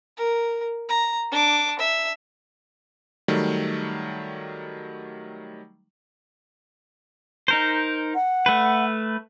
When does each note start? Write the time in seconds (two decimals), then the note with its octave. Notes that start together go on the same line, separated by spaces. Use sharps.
0.17 A#4
0.89 A#5
1.32 D4 D6
1.79 E5
3.28 D#3 F#3 G3 A3
7.48 D#4 A#4 C5
8.15 F#5
8.46 A3 B4